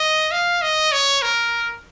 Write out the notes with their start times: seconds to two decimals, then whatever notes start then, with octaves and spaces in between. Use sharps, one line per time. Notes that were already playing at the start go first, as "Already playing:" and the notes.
Already playing: D#5
0.31 F5
0.62 D#5
0.92 C#5
1.22 A#4